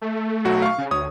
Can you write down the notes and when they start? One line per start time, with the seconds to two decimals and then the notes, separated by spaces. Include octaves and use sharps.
0.02 A3
0.45 B1 F#3 F#4
0.62 F5 C#6
0.78 C#3
0.91 D2 C#5 D#6